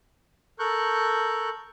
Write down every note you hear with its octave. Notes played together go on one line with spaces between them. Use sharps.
A4 A#4 C#6 F#6 G6